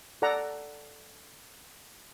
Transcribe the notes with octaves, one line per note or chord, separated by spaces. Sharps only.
A4 D5 F#5 A#5